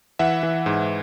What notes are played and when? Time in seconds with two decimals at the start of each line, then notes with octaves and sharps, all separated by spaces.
0.19 E3 E5 F#5
0.43 E3
0.66 G#2